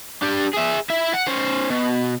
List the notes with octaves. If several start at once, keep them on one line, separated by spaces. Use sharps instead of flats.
D4 G4
G#4 E5
E4 E5
F#5
C#4 C5
B2